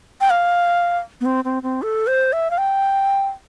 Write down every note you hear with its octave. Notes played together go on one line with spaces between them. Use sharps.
G5
F5
B3
C4
C4
C4
A4
C5
E5
F5
G5